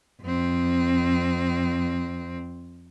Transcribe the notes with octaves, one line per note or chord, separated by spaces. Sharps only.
F2 C4